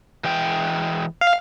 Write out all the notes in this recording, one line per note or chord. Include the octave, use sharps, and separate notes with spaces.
E3 G#3 G5
F5